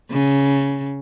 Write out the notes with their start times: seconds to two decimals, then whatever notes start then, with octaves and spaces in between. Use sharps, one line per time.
0.11 C#3